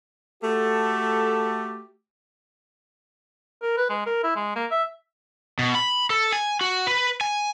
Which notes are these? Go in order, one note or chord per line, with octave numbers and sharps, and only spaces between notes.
A3 F#4 G4 A4
A#4
B4
G#3
A#4
E4
G#3
A#3
E5
B2
B5
A4
G#5
F#4
B4
G#5